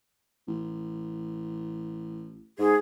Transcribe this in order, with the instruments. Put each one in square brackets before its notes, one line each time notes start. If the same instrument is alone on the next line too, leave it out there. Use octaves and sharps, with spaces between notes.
[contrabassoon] A1
[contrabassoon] G#2 [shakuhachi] G#4